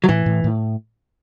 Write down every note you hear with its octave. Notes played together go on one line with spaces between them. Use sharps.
F#3
A2 E3
A2
A2